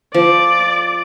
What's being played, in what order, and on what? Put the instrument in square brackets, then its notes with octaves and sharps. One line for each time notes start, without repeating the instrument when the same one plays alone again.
[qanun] F3 [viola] D5